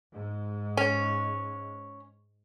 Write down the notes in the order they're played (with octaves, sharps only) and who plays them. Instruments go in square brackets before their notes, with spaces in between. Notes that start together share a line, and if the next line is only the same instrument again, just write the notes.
[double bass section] G#2
[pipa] C#4